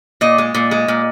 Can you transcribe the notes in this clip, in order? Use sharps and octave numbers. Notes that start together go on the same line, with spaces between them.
A#2 D#5
G#3
A#2
G#3
A#2